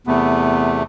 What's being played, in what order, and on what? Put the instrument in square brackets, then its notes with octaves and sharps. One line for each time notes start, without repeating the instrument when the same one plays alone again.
[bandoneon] E2 C3 A3 [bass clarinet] B3